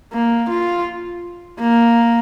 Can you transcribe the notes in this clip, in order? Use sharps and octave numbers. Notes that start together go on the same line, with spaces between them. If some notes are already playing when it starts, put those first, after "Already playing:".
A#3
F4
A#3